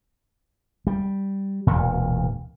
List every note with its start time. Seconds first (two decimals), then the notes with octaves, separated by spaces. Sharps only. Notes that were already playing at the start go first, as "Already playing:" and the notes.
0.87 G3
1.67 E1 D2 A#2